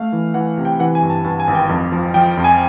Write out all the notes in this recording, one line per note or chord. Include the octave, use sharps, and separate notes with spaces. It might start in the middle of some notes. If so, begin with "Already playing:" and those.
Already playing: A3 F5
E3
E3 F#5
C3
G5
E3 F#5
G#5
G2
A5
G2 A5
G#5
G#1
G5
F2
F3
F3 G5
F2
G#5